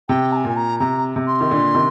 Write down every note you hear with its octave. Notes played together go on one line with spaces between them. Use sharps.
C3 G5
A#5
G#5
A#2
A#5
C3 A#5
C3
C6
D#3
A#2 D3
C3 D#3